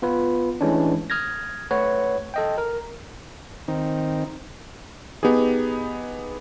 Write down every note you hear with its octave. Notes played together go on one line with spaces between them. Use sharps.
B3 F4 B4
E3 G#3 A3 C#4 D4
D#6 F6 G#6 A#6
A3 B4 C#5 F#5
A4 D#5 G5
A#4
D#3 C4 D#4
B3 D#4 G4 G#4